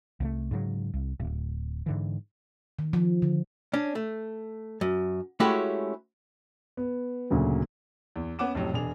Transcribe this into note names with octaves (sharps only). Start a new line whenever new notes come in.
C2 F#3 A3
G#2 C#3 E3 F#3
C2
D1
G#2 D3 E3
D#3
F3
D3
C#4 D4
A3
F#2
G#3 A3 C#4 E4 F#4 G4
B3
D2 A#2 C#3 F#3
E2
B3 C#4 F#5 D6 E7
F2 A2 C3 F#3
E1 D4 G#4 F7